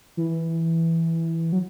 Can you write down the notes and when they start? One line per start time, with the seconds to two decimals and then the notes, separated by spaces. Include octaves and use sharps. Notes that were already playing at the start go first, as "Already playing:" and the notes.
0.17 E3
1.52 F#3